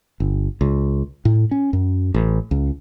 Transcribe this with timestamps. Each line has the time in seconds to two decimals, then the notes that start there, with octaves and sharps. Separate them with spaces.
0.20 G1
0.61 C#2
1.25 A2
1.51 C#4
1.73 F#2
2.14 A1
2.51 C#2